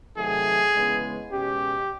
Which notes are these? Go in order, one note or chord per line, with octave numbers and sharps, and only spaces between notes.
C3 D#3 F#3 A3 G#4
C#3 E3 G#3 B3
B2 G#3 C#4 G4